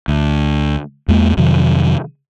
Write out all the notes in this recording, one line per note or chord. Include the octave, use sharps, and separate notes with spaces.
D2
E2 G#3 A#3
F2 C3 D#3 F#3